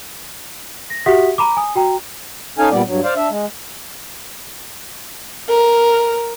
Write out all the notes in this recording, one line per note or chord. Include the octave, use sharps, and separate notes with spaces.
A#6
F#4 G4 E5 F#5 D#6 B6
A#5 B5 D6
G#5 D#6
F#4 G5 A#5
C#4 D#4 A4 F5 G#5
A#2 G3 B3 D5
G2 F#3
C5 D5 F5
D4 E5
G#3
A#4